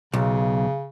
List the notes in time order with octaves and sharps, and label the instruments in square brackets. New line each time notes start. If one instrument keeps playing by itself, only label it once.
[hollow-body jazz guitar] B1 [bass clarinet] C#3